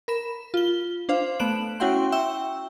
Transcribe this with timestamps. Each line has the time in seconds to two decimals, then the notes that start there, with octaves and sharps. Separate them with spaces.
0.08 A#4 B5 E7
0.54 F4 G7
1.09 D4 C5 F5
1.39 A3 B3 F#6 D7 E7 F#7
1.80 C#4 E4 F#4 F#5 G5 C6
2.12 E5 G5 C#6 E6